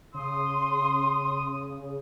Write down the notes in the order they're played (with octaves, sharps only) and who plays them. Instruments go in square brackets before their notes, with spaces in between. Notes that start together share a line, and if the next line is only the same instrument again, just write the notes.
[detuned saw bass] C#3 [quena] C6 [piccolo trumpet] D#6